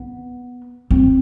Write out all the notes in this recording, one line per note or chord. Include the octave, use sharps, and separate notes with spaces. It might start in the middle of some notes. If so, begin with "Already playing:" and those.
Already playing: B3
C4